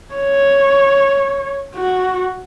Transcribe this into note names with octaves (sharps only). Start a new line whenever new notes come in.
C#5
F#4